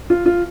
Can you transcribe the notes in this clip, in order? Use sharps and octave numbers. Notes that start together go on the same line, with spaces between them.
F4
F4